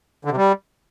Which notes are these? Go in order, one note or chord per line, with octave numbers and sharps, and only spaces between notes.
D3
C3
G3